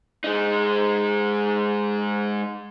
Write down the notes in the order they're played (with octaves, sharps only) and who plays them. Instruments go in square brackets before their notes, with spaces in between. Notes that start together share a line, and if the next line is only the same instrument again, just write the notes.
[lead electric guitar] G#3 D#4